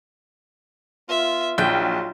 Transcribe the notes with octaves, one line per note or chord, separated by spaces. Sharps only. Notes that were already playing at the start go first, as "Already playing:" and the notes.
B3 F4 E5
A#1 F#3 D#4 F4 G5